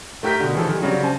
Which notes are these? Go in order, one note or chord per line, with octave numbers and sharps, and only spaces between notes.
A3 G4 A#4 G6 B6
B2 D3
E3 F3 G#4 A4
D#3 G3
C#3 F#3 G3 C4 D4
C5 G#5 A5